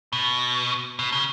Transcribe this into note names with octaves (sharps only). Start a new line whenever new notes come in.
B2
B2
C#3